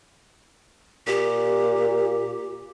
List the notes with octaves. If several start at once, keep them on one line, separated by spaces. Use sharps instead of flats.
A#2 G4